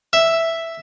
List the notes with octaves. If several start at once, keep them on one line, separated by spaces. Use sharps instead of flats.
E5